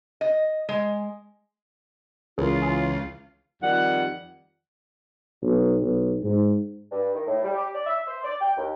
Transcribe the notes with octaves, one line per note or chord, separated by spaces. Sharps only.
D#5
G#3
C#2 E3 C#4 F4 G#4 A#4
G#5 D#6
F2 D#3 G3 F#5
B1
B1
G#2
G2
D#3
A2
G3
G4
D5
E5
C5
D5
G5
D#2